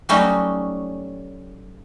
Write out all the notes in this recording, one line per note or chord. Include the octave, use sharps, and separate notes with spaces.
F#3 G3 A3 C#4 D#4 F#4